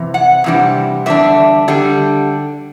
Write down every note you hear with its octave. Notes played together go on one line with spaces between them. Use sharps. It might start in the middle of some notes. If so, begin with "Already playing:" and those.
Already playing: C3 E3
F#5
C3 E3 G3 D4
E2 D3 G3 D4 E5
D3 G3 D4